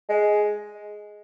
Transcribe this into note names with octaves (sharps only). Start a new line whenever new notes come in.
G#3